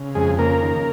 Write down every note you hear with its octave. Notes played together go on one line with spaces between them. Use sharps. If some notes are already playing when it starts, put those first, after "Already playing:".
Already playing: C#3
F2 G#3 G#4
C#3 A#3 A#4
D#3